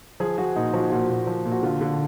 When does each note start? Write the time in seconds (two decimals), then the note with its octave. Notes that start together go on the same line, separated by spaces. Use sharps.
0.20 F3 G#4
0.38 F3 F#4
0.56 A#2 D#4
0.73 F3 F#4
0.91 A#2 F#4
1.10 A#2
1.27 F3
1.45 A#2
1.52 F#4
1.63 D3 F4
1.81 D3